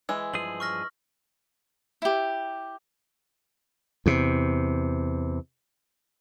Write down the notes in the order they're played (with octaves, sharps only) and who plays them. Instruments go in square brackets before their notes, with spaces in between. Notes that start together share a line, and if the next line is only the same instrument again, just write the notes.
[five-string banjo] E3 G#3 [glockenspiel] E6
[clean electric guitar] G2 F3 G#4 [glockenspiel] F#7
[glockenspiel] C#6 F6 A#6
[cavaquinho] E4 G4
[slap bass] E2 C3